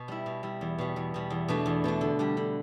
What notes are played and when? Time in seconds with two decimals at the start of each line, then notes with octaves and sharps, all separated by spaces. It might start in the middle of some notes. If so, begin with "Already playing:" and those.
Already playing: B2
0.08 G3 E4
0.26 B2
0.43 G3 E4
0.61 E2
0.78 B2 G3
0.96 E2
1.14 B2 G3
1.30 E2
1.48 B2 A3 D4
1.66 E2
1.84 B2 A3 D4
2.01 D3
2.19 G3 D4 G4
2.37 D3